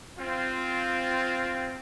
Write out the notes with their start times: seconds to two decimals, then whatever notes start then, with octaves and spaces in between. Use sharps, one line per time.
0.18 C4 F4